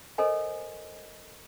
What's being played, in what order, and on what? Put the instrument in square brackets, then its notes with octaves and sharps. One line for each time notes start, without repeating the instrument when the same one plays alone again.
[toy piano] A4 A#4 C5 D#5 G#5